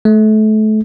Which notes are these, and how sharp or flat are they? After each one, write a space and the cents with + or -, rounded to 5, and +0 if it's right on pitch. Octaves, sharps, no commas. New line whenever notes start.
A3 -30